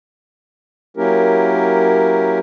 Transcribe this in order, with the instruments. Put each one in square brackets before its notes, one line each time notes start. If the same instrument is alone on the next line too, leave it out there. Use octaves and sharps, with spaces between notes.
[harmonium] F#3 A#3 C#4 E4 G4 A#4